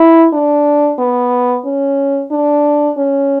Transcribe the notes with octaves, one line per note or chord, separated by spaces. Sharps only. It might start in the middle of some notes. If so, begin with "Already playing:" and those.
Already playing: E4
D4
B3
C#4
D4
C#4